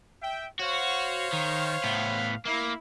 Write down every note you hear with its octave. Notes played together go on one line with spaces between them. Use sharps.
E5 G5
F#4 C5 C#5 F5
D#3
A2 B3
A#3 E4